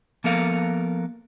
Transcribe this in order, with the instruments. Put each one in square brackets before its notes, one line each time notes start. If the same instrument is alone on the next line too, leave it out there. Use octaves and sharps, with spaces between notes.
[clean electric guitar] F3 A#3 B3 A4 A#4 F5